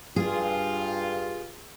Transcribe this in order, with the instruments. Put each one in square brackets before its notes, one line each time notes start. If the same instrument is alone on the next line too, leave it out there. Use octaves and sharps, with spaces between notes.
[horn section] G2 F4 [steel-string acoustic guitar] G#4